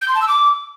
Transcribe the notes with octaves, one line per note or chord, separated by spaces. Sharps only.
G6
C6
A5
E6
D6